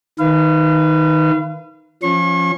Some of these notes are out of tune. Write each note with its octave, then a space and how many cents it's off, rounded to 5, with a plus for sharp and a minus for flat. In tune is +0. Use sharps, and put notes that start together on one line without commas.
D#3 +5 B4 +10 F5 -35
F3 +0 C#4 +0 C#6 -40